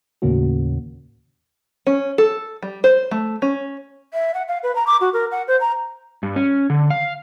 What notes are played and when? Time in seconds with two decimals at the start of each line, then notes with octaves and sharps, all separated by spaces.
0.22 D#2 A2 C#3 A#3 C#4 F#4
1.87 C#4
2.18 A4
2.63 G3
2.84 C5
3.11 A3
3.42 C#4
4.14 E5
4.34 F#5
4.48 F5
4.63 B4
4.75 A#5
4.87 D6
5.01 F#4
5.13 A#4
5.31 F#5
5.48 C5
5.60 A#5
6.23 G2
6.36 C#4
6.70 D3
6.90 F5